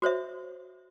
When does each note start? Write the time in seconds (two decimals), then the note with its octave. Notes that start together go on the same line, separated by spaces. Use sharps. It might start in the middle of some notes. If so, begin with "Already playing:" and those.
0.02 F#4 C5 C#5 E5